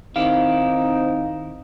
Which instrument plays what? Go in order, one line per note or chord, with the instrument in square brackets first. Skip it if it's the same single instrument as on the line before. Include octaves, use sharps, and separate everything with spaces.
[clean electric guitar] D#3 E4 G4 [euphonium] C4 [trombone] D#4 [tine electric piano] F5